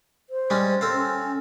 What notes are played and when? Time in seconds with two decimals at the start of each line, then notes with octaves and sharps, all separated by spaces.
0.30 C5
0.50 G3 G#3 C#4
0.81 C4 A4 F5
0.92 C#4